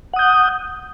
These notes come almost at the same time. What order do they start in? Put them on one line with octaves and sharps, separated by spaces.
F#5 D#6 G6